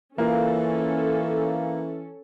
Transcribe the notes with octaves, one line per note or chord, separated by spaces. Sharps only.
E3 A#3 C#4 F4 A4